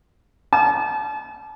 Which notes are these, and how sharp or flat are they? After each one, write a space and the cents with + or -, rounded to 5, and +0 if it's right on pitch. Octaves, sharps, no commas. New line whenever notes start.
A5 -35